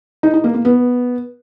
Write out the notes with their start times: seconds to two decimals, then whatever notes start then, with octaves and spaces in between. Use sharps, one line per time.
0.23 D#4
0.34 D#4
0.44 A#3
0.54 A#3
0.65 B3